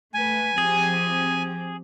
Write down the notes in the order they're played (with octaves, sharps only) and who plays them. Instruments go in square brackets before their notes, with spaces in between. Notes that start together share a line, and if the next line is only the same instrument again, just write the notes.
[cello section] A3 B4 [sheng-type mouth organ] G#5
[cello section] F3 C4 G4 [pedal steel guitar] G#4